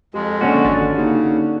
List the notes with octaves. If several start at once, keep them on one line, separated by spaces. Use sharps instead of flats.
F2 G#3 G4
D3 A#3 C#4 F#4
G#1 A6
C#3 A#3 D#4 G4